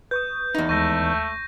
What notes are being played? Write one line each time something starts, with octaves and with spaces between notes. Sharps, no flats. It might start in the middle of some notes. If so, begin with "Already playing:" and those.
B4 C#6 D#6 G6
E2 D#4
D#2 G#3 A3 C#6 G6 A#6